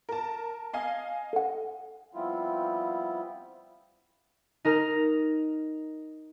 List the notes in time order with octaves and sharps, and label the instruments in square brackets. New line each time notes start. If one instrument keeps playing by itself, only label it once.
[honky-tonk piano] A#4 A5
D#5 F5 G#5
[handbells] A4 F#5
[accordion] F3 G3 B3 C4 E4 F4
[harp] D#4 A#4 A#5 F6